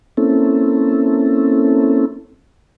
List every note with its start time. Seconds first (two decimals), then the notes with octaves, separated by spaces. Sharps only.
0.17 A#3 C4 C#4 E4 A4